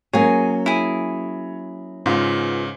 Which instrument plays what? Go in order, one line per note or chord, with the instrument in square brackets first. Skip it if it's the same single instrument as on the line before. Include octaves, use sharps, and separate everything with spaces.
[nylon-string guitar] F#3 A#3 C#4 [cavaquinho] G#4 G#5 [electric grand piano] C#5
[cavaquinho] E4 G#4
[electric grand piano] G#2 C#3 [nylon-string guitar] B3 F4